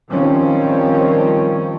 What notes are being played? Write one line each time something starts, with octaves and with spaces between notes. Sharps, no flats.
D#3 F3 G3 C4 C#4